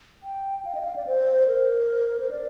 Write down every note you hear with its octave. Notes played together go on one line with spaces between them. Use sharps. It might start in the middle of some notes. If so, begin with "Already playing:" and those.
G5
F5
D#5
G5
F5
D5
C5
A#4
C5
D5